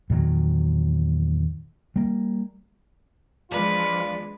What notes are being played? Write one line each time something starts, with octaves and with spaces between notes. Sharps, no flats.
E2 A#2 D#3 F#3
G3 A#3
E2 F3 G#3 D4 F4 B4 D5